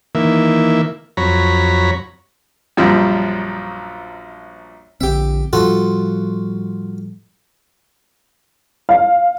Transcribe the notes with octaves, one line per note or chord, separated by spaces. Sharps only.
D#3 E3 A#3 E5
F2 F#3 C#5 A#5 B5
A#1 F#2 F3 G3
A#1 D3 C4 G4 E5
A2 F3 G3 F4 F#4 A4
F5